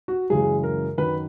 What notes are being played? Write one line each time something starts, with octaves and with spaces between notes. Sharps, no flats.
F#4
F#2 C#3 E3 G#3 G#4
A#4
F#2 D#3 F#3 B4